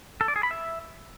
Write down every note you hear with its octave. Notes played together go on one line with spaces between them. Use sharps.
A4
D5
G#4
B5
E5